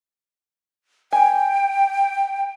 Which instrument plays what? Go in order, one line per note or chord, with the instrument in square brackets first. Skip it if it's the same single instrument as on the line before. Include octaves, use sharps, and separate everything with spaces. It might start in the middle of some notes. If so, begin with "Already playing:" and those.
[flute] G5 [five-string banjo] G#5